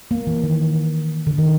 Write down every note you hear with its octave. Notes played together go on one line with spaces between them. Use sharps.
A#3
E3
D#3
D3
D#3